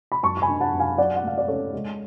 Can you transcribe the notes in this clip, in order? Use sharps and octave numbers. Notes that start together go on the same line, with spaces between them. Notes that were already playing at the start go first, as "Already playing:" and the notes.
B5
F#2 A5 C#6
C#6
G#5 B5
D4
F#5 A5
F#2
F5 G#5
F#3 D5 F#5
F#5
A3 F5
D5
C#4 A4 C#5
G#3